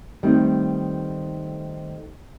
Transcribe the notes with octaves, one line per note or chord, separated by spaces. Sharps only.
D#3 G3 A3 B3 C4